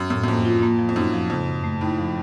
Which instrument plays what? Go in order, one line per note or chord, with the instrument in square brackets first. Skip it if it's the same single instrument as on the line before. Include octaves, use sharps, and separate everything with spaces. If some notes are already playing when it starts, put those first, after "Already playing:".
Already playing: [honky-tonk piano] F#2
[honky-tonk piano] F#2 [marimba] A2
[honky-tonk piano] F#2
[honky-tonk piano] F2 [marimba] A#3
[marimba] F4
A#3
F3
[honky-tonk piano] F2
[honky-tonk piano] F#2 [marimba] D#4
[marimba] F3
[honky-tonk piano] F2 [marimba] C#3
[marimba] F#2
A3
[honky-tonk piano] A2 [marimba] D#4
[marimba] F3